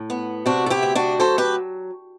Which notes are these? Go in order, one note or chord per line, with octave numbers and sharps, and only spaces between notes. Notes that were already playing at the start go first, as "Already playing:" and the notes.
Already playing: A2
B3
C3 D4 F#4
A4
E4 G4
D2
D4 F#4
F#3 A4 C5
G4 B4